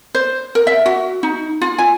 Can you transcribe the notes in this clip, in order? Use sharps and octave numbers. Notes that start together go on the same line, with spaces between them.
C5
A#4
E5
F#4
D#4
F4
G#5